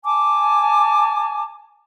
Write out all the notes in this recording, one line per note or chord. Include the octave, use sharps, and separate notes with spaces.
G#5 A5 D6